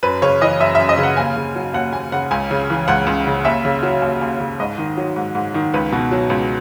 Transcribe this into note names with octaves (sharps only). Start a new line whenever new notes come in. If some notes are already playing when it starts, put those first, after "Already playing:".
F#2 B4
C#3 C#5
E3 D#5
F#2 E5
F#2 E5
D#5
C#3
F#5
D#2 G#5
C#3
F#3
D#2 F#5
D#2 G#5
C#3 F#5
C#2 G#5
C#3
E3
C#2 F#5
C#2
C#3
D#2 E5
C#3
F#3
D#2
D#2
C#3
G#2 D#5
D#3
F#3
G#2
G#2
D#3
C#2 B4
B2
F#3
C#2